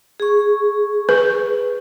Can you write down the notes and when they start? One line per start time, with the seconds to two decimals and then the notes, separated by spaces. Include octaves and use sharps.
0.20 G#4 C#6
1.09 B4